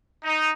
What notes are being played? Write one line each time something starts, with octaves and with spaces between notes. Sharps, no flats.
D#4